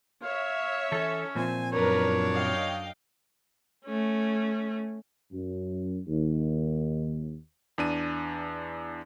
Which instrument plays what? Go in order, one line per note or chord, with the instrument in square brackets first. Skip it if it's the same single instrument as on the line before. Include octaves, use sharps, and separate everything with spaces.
[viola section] C#5 E5 [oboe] F5
[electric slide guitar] E3 A4 [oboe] C#4
[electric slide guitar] A#2 F3 C4 [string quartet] C5 G#5
[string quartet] F#2 D4 [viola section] A#4 B4 [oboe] C#5
[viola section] D#5 F5 G5
[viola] A3 C#4
[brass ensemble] F#2
D#2
[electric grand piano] E2 D4 D#7